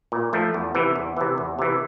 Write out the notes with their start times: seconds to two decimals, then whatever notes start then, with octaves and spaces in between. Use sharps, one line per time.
0.12 A#2
0.33 F3 A3
0.54 E2
0.75 C3 E3
0.96 E2
1.17 C3 E3
1.38 E2
1.59 C3 E3